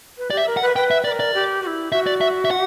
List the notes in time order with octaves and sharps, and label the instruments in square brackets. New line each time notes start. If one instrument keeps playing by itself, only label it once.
[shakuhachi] B4
[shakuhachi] G4 [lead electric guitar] D5
[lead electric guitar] E5
[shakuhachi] A#4
[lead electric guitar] F#5
[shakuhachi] B4
[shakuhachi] B4 [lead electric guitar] G5
[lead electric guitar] E5
[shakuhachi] B4 [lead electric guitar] D5
[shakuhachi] A#4
[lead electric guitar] D5
[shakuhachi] G4
F#4
E4
[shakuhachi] F#4 [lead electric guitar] E5
[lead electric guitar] D5
E5
E5
F#5